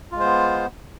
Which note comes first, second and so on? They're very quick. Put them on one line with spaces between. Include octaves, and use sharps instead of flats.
F4 G#3 C5 B3